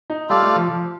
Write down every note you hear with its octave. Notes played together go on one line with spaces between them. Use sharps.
D#4
G3 F4 A4 D5 F5
A3
F3
F3